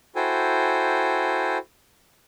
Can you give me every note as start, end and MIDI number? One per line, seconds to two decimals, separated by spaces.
0.16 1.58 64
0.16 1.58 66
0.16 1.58 69
0.16 1.58 72
0.16 1.58 79
0.16 1.58 80